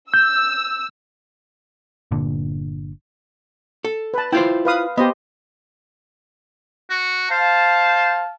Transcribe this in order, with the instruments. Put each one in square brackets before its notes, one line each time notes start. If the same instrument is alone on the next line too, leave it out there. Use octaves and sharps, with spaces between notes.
[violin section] E6 [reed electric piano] G6
[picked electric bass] G1 A#2 D3
[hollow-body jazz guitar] A4
[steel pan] B4 A5
[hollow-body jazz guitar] E4 F4 C5 [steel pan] G5
[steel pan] B4 F5 D#6
[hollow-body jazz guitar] B3 [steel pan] G4 C5 D#5
[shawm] F#4
[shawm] C5 [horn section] F5 A5